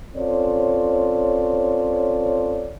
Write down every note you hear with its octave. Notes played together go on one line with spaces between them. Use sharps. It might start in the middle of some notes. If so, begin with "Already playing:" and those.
C4 C#4 F4 A4 C#5 D5